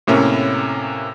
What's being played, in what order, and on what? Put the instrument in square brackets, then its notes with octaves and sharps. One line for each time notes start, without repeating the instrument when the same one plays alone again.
[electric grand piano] A2 C3 A#3 C#4 E4